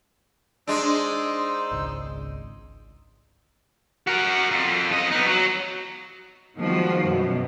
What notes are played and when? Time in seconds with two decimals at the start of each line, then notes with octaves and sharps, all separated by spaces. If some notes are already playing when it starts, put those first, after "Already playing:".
0.67 G#3 D4 D#4 C5 E6
1.71 G#1 C#2
4.07 F#4 A#4
4.51 F2
4.91 F2 D#5
5.11 B3 D#4
5.26 F#3
6.59 D#3 F3 G3 G#3 B3 F#4
7.06 F#2 B2